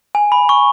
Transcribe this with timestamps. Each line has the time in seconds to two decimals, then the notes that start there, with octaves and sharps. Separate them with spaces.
0.15 G#5
0.32 B5
0.49 C#6